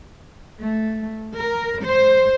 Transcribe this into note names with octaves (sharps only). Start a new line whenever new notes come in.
A3
A#4
C5